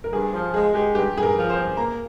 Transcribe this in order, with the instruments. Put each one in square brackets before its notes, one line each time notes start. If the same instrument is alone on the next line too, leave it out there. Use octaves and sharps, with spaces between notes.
[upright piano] A#4
[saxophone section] G2 [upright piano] G#4
[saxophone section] F3
[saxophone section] G#3 [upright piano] G#4
[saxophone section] G#3 [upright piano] G4
[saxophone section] G2 [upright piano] G4
[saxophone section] G2 [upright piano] G#4
[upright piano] A#4
[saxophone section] F3
[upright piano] C5
[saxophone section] G2
[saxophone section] A#3 [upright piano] A#5